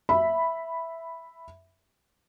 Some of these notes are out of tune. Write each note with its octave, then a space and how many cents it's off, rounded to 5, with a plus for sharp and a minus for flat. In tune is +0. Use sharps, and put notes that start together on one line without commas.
E5 +0 B5 +0